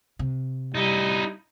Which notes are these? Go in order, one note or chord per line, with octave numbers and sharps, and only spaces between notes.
C3
G3 D#4 E4